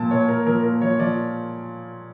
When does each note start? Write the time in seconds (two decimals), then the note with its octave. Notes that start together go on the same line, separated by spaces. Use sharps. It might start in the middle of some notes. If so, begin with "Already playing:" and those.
Already playing: A#2 F3 A5
0.11 A#2 C#5
0.29 A#2 A#4
0.46 F3 A#4
0.63 A#2 A#4
0.82 F3 C#5
0.99 F3 D5